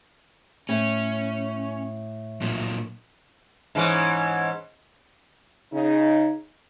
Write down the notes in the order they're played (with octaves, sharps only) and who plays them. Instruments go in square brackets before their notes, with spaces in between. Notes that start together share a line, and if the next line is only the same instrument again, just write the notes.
[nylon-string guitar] A2 [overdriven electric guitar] C#4
[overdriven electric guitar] A#2 F#3
[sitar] G#2 E3 C#4
[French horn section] C#3 D#4